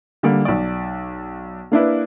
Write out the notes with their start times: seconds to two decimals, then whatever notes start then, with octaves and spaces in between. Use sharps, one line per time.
0.23 D3 G3 A#3 D5
0.45 B1 D5
1.72 A#3 D4 E4 B4